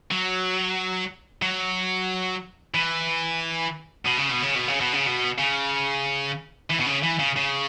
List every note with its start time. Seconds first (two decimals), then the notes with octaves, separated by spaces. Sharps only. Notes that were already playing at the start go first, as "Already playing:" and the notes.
0.11 F#3
1.42 F#3
2.74 E3
4.06 B2
4.18 C#3
4.31 B2
4.43 C#3
4.56 B2
4.68 C#3
4.80 B2
4.93 C#3
5.06 B2
5.38 C#3
6.70 E3
6.80 B2
6.86 C#3
7.03 E3
7.19 C#3
7.37 C#3